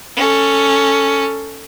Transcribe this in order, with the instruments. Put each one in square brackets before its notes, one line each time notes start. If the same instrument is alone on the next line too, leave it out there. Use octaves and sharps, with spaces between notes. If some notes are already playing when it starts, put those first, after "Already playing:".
[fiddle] C#4 A4